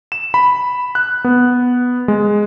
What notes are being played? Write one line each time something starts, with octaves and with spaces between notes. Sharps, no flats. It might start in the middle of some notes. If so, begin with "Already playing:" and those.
E7
B5
F#6
B3
G#3